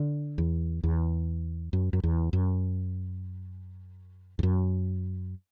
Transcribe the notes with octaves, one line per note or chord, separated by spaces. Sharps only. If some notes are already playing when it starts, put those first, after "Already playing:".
Already playing: D3
E2
E2
F#2
F#2
E2
F#2
E2
F#2